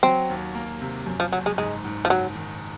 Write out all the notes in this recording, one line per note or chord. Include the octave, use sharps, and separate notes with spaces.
F#3 C4
D#2
A#3
C3
F#2
F3
F#1 F#3
G#3
G#2 G#3
G#2
F3
F#1 F#3
D#3